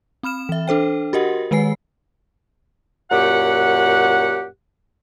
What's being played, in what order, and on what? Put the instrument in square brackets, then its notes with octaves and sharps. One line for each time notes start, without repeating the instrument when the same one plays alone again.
[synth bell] C4 B5 F6 E7
E3 E5
D4 A4 C5 G5
F#4 G4 A#4 D#5 F#5
D#3 G#3 B4 G#5 C7
[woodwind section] F#2 A#2 G4 F#5